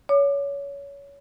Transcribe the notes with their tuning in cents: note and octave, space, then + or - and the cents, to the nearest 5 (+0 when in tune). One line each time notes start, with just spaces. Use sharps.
C#5 +25 D6 +30